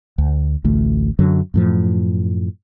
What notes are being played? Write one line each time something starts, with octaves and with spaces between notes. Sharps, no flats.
D2
A1 D2 A3
F#2 D3 F#3
F#2 A2 F3